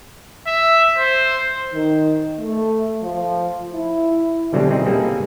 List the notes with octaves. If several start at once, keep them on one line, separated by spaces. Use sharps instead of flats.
E5
C5
D#3
A3
F3
E4
B2 D3 F#3 G3 C4 C#4
C4 D#4 E4 G#4
G3 A#3 C4 G#4 A4 B4